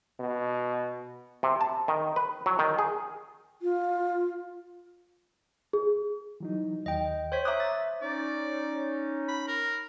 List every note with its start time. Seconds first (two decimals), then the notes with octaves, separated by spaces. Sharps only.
0.20 B2
1.43 C3
1.61 A5
1.88 D#3
2.16 B4
2.46 F#3
2.59 D#3
2.79 G#4
3.62 F4
5.73 G#4
6.40 E3 F#3 D#4
6.86 D#2 D#5 G5
7.32 C5 C#5 B6
7.45 E5 A#5 D6 D#6 F#6
7.60 A6
8.01 C#4 D#4 D5
9.28 B5
9.48 A#4